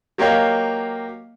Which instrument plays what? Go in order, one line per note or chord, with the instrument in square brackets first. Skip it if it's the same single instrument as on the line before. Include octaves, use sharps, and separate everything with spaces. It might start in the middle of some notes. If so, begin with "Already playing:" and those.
[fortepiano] F#3 A#3 G4 C#5 D#5 F5